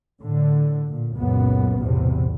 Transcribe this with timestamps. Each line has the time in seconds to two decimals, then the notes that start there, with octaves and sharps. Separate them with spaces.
0.20 A2 D3
0.89 A#2
1.18 C#2 F#2 A#2 B3
1.80 B1 E2 A2 C3